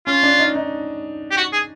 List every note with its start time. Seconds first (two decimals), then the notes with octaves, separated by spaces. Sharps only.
0.07 C#4 F4
0.23 D4
0.39 D#4
0.55 D#4
1.31 G4
1.37 F#4
1.53 G#4